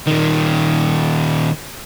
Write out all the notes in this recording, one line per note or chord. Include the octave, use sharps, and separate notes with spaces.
A#2 D#3